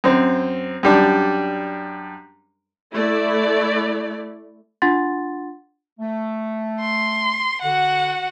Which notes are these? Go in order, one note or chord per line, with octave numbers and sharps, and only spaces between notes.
F#2 C4
F#2 G3 D4
A3 E4 D5
D4 F4 F#5 C6 A6
A3
C6
D3 F#4 F#5